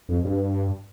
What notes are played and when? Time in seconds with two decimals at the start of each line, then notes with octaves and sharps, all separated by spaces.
0.09 F2
0.25 G2